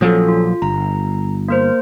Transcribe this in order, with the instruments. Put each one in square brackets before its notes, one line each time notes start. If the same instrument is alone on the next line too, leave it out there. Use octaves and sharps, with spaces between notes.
[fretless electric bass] A#1 F3 F#3 [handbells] C#4 A4
[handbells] F4
[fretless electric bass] G1 [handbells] A#5
[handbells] A#3 A#4 C5